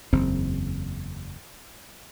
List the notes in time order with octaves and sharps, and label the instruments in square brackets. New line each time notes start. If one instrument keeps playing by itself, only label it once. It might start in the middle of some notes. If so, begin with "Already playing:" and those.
[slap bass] F#1 E2 C4